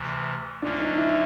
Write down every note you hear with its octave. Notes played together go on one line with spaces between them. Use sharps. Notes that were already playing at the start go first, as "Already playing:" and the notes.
Already playing: D2 C3 E3
D2 D3 F#3 A#3 C#4 D4
D#4
E4